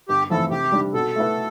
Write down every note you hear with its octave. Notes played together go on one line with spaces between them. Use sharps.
G1 G4
F2 E3 A3 A4
C3 G4
G3 D4
B2 A4
A3 E4 B4